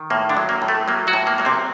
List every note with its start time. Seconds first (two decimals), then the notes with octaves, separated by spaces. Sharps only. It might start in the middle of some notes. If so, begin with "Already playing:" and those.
Already playing: D#3
0.10 A2 A#3
0.29 D3 D4
0.37 F#3
0.49 A#3
0.62 A2
0.68 A3
0.88 F#3 A#3
1.07 F#3 F#4
1.13 A2
1.27 A#3
1.38 F#3 A#3
1.45 C3 C4